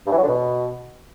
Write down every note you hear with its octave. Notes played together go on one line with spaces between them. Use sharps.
G2
E3
F#3
D3
B2